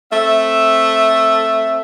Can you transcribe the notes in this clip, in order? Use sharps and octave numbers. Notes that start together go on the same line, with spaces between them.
A3 C4 E5